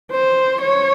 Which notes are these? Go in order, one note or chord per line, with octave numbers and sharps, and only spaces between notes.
C5
C#5